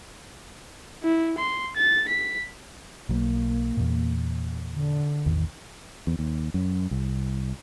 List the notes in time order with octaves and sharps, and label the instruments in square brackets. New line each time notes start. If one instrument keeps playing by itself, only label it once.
[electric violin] E4
C6
A6
B6
[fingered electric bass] B1 F#3 [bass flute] A#3
[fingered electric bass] E2 A#2
[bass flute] D3
[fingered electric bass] A1 E2 D#3
[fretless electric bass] E2
D#2
F#2
C2